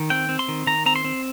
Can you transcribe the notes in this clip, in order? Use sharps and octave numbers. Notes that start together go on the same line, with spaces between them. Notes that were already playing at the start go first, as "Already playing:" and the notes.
Already playing: D#3
C4 G5
C4
C6
D#3
D#3 A#5
C4 A#5
C6
C4